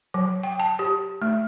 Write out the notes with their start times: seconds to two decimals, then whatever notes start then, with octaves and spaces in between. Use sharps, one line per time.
0.14 F#3
0.43 G5
0.59 A5
0.79 G4
1.22 A3